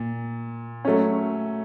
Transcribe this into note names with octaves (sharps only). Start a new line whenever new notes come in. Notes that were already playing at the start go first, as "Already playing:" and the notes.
Already playing: A#2
F#3 A3 C#4